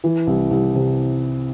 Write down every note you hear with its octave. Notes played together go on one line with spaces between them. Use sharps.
E3
C2
C2
C3